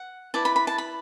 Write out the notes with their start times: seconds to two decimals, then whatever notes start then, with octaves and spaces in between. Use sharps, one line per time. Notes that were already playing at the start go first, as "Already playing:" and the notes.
Already playing: F#5
0.34 E4 B4 D5 A5
0.45 B5
0.56 B5
0.67 A5
0.78 B5